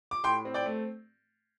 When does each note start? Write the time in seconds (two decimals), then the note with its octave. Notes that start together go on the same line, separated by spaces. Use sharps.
0.11 D6
0.24 A2 G5 C6
0.45 C4
0.54 D5 G5
0.66 A3